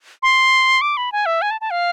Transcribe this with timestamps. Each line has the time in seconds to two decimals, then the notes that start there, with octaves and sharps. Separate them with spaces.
0.23 C6
0.81 D6
0.97 B5
1.12 G#5
1.26 E5
1.42 G#5
1.51 A5
1.61 A5
1.71 F5